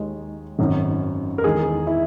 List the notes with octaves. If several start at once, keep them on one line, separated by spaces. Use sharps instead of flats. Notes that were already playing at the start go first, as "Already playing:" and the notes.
Already playing: D#2 D#3 G#3
G#1 F#2 D#3
A#4
E2 D#3 G#3 G#4
E4